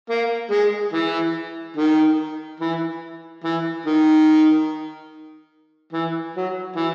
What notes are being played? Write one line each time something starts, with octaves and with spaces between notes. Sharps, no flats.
A#3
G#3
E3
D#3
E3
E3
D#3
E3
F#3
E3